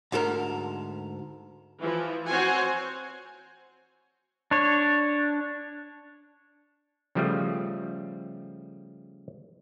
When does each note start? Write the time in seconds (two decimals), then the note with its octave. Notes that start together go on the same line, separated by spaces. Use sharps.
0.12 D2 G#2 A4 A#4
1.80 E3 F3
2.28 C4 F#4 C5 C#5 F#5 G#5
4.51 D4 C#5
7.15 C#3 F3 G3 A3